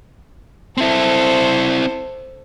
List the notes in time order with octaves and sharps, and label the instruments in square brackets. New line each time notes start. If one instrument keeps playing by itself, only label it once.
[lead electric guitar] C4 E4 [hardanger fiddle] A4 C5